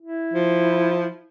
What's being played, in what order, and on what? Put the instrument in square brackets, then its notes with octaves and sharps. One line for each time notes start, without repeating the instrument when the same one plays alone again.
[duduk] E4
[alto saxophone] F3